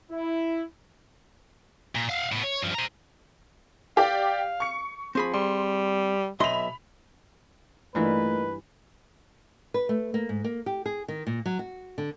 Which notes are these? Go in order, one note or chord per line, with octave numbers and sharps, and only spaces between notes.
E4
A#2
F5 F#5
A2 B3
C#5
G2 F3
C5 A#5
G4 D5 F5
C#6 C#7
F3 C4 G#4 B5
G3 C6
B1 D#5 E5 B5 C6 F7
G2 E3 A3 A#3 D#4 F4 B4
B4
A3
A#3
G#2
A#3
G4
G#4
D#3
A#2
F#3
F#4
D3